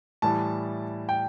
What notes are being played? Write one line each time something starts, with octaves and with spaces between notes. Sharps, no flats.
A2 E3 G3 A5
G5